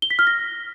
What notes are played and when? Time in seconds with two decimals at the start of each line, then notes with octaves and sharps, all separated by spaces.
0.02 G7
0.11 B6
0.19 F6
0.27 A#6